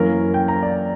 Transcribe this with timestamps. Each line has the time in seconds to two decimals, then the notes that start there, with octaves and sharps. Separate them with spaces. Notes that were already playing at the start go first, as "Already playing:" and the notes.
Already playing: F#2 E3 A#3 C#4 A#4
0.34 G5
0.48 A#5
0.63 D5